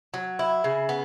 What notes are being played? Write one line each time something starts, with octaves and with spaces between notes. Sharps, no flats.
F#3
E4
C#3
B3